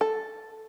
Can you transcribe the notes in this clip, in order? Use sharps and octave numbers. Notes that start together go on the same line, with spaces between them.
A4